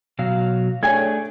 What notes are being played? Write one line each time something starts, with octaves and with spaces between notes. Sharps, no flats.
B2 F#3 F5
A3 D4 G#4 C#5 G#5 G#6